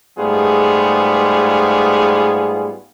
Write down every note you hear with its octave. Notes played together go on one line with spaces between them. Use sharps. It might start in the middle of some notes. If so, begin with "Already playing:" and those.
G#2 G3 A3 B3 F4 G#4